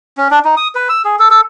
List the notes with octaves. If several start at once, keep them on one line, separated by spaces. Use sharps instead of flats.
C#4
D4
D#4
D#6
B4
E6
G#4
A4
A4